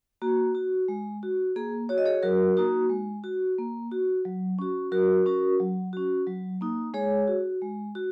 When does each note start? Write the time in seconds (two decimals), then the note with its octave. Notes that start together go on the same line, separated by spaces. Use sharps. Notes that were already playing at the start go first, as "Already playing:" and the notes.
0.22 A#3 F#4
0.55 F#4
0.88 G#3
1.23 F#4
1.56 A#3 G#4
1.89 F#4 C#5
1.98 D#5
2.05 G#4 C#5
2.23 F#3 F#4 A#4
2.57 A#3 D#4 F#4
2.90 G#3
3.24 F#4
3.58 A#3
3.91 F#4
4.25 F#3
4.59 C#4 F#4
4.92 F#3 F#4 A#4
5.26 C#4 F#4
5.60 F#3
5.93 C#4 F#4
6.27 F#3
6.61 A#3 D#4
6.94 G#3 G#4 C#5
7.28 F#4
7.62 G#3
7.95 F#4